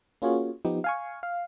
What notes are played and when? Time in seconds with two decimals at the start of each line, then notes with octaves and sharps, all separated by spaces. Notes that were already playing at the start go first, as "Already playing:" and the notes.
0.22 A#3 C#4 F4 F#4 G#4 C#5
0.65 F3 B3 D#4 G4
0.84 F5 G#5 C#6
1.23 F5